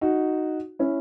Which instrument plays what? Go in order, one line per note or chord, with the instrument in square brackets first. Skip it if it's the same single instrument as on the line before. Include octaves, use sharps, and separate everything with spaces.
[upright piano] D#4 F#4
C#4 E4